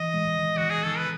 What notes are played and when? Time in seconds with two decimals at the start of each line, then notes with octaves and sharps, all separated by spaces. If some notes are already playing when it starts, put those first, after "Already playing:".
Already playing: E3 D#5
0.14 G#3
0.38 D#3
0.57 D#3 F#4
0.71 G#4
0.84 D#3 A4
0.97 B4